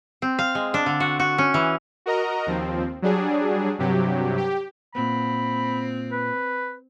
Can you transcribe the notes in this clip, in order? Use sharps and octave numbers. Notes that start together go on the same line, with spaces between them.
C4
F5
G#3
D4
D3
F#4
F#4
C#4
E3
F#4 A#4 D#5 A#5
D#2 F3 C4
F#3 G3 D4 G#4
G2 C3 F#3 G4
G4
A#2 B3 C4 B5
B4